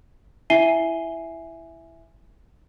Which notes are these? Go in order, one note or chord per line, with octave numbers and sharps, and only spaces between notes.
E4 E5 G#5 C7 D#7 G7